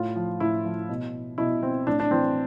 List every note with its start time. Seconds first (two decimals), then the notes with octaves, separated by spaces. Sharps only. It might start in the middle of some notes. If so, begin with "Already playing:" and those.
Already playing: A2 F4
0.16 F3
0.40 A2 E4
0.65 F3
0.89 B2
1.38 B2 E4
1.63 C4
1.87 A2 D4
2.00 D4
2.11 E3 C4